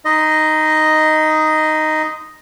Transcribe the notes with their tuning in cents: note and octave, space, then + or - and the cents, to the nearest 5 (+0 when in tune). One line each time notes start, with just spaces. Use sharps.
D#4 +0 D#5 +0 C6 -40